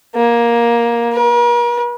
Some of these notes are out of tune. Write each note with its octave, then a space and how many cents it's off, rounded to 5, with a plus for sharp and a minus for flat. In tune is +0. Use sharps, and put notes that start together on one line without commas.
A#3 +15
A#4 +45